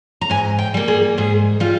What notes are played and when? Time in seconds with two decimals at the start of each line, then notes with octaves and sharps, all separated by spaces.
0.21 A#5
0.30 G#2 G#5
0.59 G5
0.74 G3 A#3
0.88 G#4
1.18 G#2 G#4
1.60 G3 F4